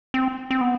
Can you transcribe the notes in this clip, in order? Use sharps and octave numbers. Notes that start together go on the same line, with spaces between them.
C4
C4
B3